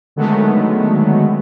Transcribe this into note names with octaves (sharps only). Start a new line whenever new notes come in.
D3 D#3 F#3 G#3 A3 B3